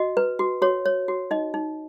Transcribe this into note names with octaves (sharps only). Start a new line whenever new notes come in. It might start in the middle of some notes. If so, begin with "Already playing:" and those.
Already playing: F#4 D#5
B4
F#4
F#4 C#5
C#5
F#4
D#4 D#5
D#4